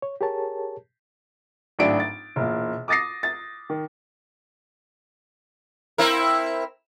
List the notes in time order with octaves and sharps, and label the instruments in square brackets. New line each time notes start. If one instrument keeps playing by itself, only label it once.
[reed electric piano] C#5
G4 G#4 A#4 C#5 A5
[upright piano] G#1 A2 F#3 D4 E5 D7
A6
E1 A#2
D6 D#6 A6 A#6 C7
A6
D#3
[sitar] C4 E4 A#4